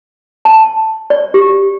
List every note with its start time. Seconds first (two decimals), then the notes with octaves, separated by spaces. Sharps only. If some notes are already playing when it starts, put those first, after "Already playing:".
0.45 A5
1.10 D5
1.34 G4